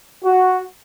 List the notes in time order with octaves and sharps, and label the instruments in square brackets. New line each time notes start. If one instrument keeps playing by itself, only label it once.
[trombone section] F#4